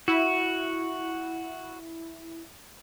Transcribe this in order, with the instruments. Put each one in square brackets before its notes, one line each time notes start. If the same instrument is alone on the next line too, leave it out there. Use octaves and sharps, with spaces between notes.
[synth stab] E4 [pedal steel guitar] F#4